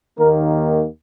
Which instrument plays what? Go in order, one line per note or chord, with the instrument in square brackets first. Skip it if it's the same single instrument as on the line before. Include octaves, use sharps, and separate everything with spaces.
[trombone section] D#2 D#3 A#3 A#4